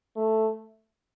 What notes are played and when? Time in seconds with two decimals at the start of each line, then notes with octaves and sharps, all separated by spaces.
0.16 A3